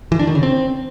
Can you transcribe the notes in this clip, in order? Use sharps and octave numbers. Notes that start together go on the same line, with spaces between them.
E3
D4
D#3
C#3
C4